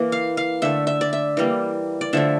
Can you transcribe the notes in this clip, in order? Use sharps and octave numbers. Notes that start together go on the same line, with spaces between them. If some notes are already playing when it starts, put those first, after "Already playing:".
Already playing: E3 A#3
F5
F5
D3 A3 E5
E5
D5
E5
E3 G3 A#3
D5
D3 F3 A3 E5